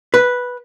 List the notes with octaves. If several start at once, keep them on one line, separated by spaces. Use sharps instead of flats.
B4